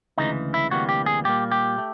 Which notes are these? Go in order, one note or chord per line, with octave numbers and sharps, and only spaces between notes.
D2 C#3 E3 G#3 D#4
E4
D2 C3 E3 G3 A#3 F#4
G4
G#4
A#2 G3 A#3 G4
G4
A3